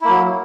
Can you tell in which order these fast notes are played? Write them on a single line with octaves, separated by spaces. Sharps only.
E4 A#3 F#3